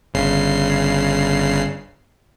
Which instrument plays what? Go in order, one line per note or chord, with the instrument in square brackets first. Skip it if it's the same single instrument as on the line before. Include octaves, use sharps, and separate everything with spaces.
[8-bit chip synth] G1 C#3 C7